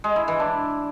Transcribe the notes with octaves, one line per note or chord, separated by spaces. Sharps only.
G#3
E4
E3
D4